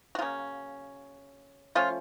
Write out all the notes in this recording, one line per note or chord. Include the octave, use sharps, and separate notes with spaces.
F#4
C#3 F#3 A#3 C#4 F4
F3 A3 C#4 F4